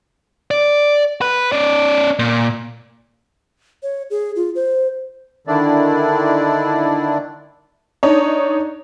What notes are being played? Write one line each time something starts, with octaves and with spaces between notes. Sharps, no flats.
D5
B4
C#4 D5
A#2
C#5
G#4
F4
C5
D3 D#3 D4 E4 D5
D4 D#4 C#5